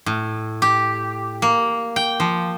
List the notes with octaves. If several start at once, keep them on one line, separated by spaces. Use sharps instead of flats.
A2
G4
A#3
G5
F3